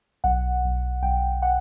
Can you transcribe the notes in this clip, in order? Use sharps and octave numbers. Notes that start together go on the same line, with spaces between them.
B1 F#5
B1
B1 G5
F#5